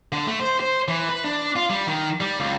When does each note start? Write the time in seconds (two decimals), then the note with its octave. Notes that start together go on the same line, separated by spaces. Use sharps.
0.12 D3
0.27 A3
0.40 C5
0.60 C5
0.88 E3
1.09 B4
1.24 D4
1.56 F4
1.70 G3
1.87 D#3
2.21 G3
2.40 C#2